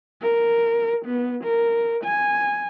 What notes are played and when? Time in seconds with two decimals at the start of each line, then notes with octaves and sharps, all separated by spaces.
0.22 A#4
1.05 B3
1.44 A#4
2.04 G#5